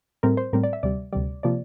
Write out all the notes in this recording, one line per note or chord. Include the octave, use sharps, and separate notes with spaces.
A2 G3 C4 A#4
C5
A2 G3 C4 A#4
D5
E5
D2 C3 G3 D5
D2 C3 G3 D5
C3 F3 A#3 D5